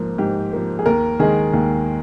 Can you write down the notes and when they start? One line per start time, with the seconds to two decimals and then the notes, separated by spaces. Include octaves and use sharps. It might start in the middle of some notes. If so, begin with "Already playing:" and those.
Already playing: G#2 F3 A#3
0.18 G#2 G4
0.53 F3 A#3
0.79 G#4
0.86 D#2 A#4
1.20 D#3 G#3 G#4
1.53 D#2